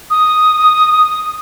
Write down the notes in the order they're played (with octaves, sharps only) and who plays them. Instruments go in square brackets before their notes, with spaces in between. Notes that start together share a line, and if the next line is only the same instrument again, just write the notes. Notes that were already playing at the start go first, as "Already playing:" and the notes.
[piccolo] D#6